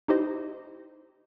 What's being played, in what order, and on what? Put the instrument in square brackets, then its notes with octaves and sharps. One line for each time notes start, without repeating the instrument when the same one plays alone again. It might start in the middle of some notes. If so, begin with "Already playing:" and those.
[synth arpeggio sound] D#4 E4 G4 C5 D#5